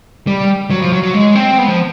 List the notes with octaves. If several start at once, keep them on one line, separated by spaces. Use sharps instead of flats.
G3
F#3
F3
F#3
F#3
G#3
C4
B3
F3